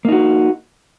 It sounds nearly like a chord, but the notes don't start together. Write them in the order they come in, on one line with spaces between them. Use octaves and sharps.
A#3 D#4 F#4